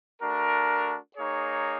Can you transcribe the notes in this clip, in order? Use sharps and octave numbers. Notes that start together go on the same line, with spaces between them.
A3 D4 F#4 A#4
A#3 D#4 G#4 C#5